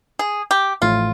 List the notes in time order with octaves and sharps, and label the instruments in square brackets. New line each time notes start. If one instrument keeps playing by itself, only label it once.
[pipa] G#4
G4
[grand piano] A1 A2 F3 A3 [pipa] F4